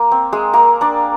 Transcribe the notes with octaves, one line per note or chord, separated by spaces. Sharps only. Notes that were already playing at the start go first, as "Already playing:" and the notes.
Already playing: A#3
C4
G#3 G#4
A#3 A#4
D4 D5